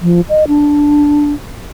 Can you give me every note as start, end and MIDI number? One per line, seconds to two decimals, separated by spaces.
0.02 0.21 53
0.29 0.44 75
0.48 1.33 62